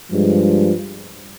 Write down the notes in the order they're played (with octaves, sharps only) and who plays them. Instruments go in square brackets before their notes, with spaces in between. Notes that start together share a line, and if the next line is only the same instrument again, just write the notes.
[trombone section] G2 F3 G#3